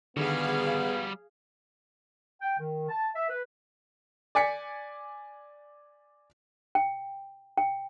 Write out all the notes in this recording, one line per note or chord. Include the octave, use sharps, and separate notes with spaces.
D3 D#3 G3 B3 F#4 G#4 F5
G5
D#3
A5
E5
B4
D5 G#5 B6 C#7
G5
G5